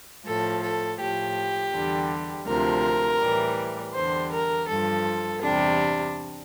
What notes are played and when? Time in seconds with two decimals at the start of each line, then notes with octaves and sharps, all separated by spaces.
0.25 A2 F3 A4
0.61 A4
0.98 A2 F3 G4
1.72 E2 D3 G3
2.46 D2 C3 F3 A#4
3.20 A2 E3 G3
3.94 E2 D3 G3 C5
4.31 A#4
4.68 G2 F3 A4
5.42 E2 C3 G3 D4